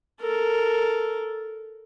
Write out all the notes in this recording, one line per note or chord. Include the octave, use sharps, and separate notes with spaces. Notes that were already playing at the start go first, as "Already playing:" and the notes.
A4 A#4